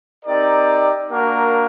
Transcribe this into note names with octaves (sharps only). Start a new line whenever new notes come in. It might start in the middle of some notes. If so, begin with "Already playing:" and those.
C4 D#4 G4 A#4 D5
A#3 D4 F#4 A#4